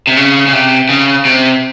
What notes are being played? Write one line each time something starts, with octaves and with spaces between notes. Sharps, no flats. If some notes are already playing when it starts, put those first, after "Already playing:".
C3
C#3
C#3
C3
C#3
C3